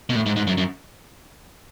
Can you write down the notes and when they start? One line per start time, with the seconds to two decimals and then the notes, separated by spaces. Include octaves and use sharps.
0.10 B2
0.15 A2
0.26 G#2
0.36 G#2
0.47 F#2
0.58 F#2